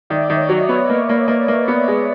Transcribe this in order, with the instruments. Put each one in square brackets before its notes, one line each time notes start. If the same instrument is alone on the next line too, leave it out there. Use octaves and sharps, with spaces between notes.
[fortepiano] D#3 [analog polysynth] D5 E5
[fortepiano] D#3
[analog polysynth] C#5 D#5
[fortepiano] F#3
[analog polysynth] C#5 D#5
[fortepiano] B3
[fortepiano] A#3 [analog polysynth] B4 C#5
[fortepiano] A#3
A#3
A#3
B3
G#3